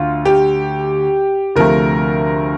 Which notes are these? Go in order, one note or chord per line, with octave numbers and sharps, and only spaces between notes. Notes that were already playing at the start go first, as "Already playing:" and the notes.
Already playing: D2 F4
G4
D2 C3 F3 A3 A#4